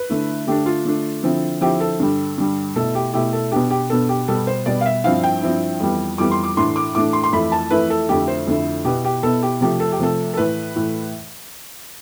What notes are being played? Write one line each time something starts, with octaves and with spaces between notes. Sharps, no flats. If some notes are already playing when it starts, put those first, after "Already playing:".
Already playing: B4
D3 A3 E4
D3 A3 D4 G4
F4
D3 A3 D4
D3 F3 C4 E4
D3 F3 C4 E4 G4
A4
G2 D3 G3
G2 D3 G3
B2 A3 E4 A4
G4
B2 A3 E4 G4
A4
B2 B3 D4 G4
G4
B2 B3 D4 A4
G4
B2 G3 B3 A4
C5
B2 G3 B3 D5
F5
E5
G2 F3 C4 E4 F5
G5
G2 F3 C4 E4
F2 E3 G3 B3
F2 E3 G3 B3 D6
C6
D6
A2 E3 A3 D4 C6
D6
A2 E3 A3 D4 D6
C6
C6
F2 E3 A3 E4 B5
A5
F2 E3 A3 E4 B4
A4
F2 D3 A3 E4 G4
C5
F2 D3 A3 E4
B2 B3 E4 G4
G4
B2 B3 E4 A4
G4
C3 F3 A3 G4
A4
G4
C3 F3 A3 A4
A4
A2 E3 A3 B4
A2 E3 A3